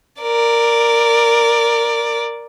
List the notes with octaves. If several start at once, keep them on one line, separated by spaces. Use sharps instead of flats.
A#4 D5